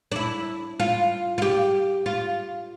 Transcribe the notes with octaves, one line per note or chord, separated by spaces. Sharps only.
D4
E4
F4
F4
G4
F4